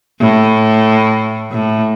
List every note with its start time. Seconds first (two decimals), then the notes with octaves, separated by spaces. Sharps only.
0.20 A2
1.51 A2